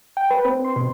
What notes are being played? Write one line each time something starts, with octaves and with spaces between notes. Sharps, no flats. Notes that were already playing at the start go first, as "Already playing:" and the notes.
G5
B4
C4
C6
B2